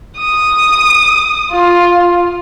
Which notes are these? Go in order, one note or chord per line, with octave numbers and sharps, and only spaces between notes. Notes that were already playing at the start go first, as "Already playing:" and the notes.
D#6
F4